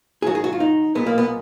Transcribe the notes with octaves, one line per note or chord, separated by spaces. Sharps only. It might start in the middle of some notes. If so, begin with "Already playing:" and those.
G#4
G#2 D#3 F#3 F#4
G#4
F#4
F4
D#4
B1 A#2 G#3 B3
A#3
B3